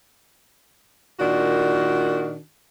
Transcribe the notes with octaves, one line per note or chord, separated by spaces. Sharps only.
A#2 D#3 D4 F#4